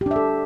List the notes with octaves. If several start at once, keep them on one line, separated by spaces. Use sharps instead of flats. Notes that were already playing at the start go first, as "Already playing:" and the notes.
D4 G4 A4 E5